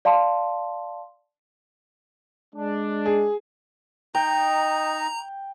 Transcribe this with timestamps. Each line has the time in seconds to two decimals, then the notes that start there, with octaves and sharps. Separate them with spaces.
0.05 D5 F5 A5 C6
2.55 G#3 D4
3.06 G#4
4.15 D#4 D#5 G5 A#5